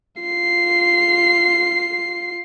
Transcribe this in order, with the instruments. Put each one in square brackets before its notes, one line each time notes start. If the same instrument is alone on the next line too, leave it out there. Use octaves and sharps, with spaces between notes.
[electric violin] F4 C7